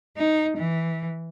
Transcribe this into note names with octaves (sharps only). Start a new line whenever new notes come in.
D#4
E3